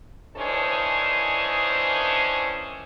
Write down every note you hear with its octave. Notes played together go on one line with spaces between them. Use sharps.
D#3 E3 C#4 D4 G#4 C5